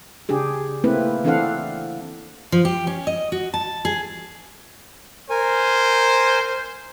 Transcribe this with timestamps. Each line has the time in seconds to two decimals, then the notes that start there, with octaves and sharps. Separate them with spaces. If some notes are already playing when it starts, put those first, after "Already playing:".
0.29 C#3 D4 G4 G#4
0.84 A3 A#3 C4 E4 B4
1.24 E3 C4 D4 A4 F5 F#5
2.52 F3
2.65 G4
2.87 C#4
3.07 D#5
3.32 F#4
3.54 A5
3.85 G#4
5.30 A#4 C5 G#5